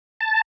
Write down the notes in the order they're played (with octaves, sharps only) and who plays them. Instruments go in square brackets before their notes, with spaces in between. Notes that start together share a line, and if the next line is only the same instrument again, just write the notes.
[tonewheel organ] A5